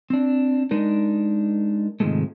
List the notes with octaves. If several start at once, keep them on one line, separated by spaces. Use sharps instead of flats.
C4 D4
G#3 D4 D#4 A#4
G#2 C3 D#3 F3 G#3 A3